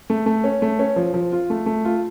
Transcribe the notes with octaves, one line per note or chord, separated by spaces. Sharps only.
A3
A3
C#4
A3
C#4
F3
F3
F4
A3
A3
F4